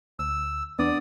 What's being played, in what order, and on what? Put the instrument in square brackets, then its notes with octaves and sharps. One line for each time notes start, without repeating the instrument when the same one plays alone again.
[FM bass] D2 [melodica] E6
[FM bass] E2 [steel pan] B3 D4 [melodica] D5 D#6